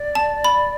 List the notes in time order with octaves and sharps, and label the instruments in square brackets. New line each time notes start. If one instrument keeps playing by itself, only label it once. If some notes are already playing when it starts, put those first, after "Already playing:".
Already playing: [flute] D5
[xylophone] A5
B5